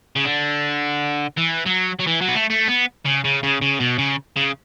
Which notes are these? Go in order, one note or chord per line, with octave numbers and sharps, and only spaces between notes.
C#3
D3
E3
F#3
F#3
E3
F#3
B3
A3
A3
B3
C#3
C#3
C#3
C#3
B2
C#3
C#3